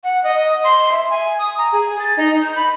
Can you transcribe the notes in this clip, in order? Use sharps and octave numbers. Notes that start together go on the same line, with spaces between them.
F#5
D#5
C6
E5
G#5
D#6
A#5
G#4
A6
D#4
G6
B5